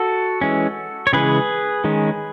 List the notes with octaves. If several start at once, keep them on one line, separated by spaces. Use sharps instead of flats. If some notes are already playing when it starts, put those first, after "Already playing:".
Already playing: F#4 A4
E3 G#3 C#4
C#5
C#3 E3 G#3 G#4 B4
D#3 G#3 C#4